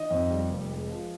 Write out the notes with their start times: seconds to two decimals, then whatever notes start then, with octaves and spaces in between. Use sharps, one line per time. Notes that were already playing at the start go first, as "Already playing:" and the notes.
Already playing: D#3 D#5
0.11 F2
0.30 G3
0.50 F1
0.69 G#3
0.89 F3